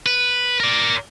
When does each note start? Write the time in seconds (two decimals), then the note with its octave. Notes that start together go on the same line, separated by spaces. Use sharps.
0.06 B4
0.60 A#4 D5